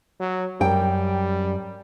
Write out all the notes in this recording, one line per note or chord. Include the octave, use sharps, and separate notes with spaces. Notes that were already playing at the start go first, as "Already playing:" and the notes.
F#3
F#2 G3 G5